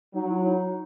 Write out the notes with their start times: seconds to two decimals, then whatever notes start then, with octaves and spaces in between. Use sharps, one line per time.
0.14 F#3 D#4
0.30 E4
0.45 D#4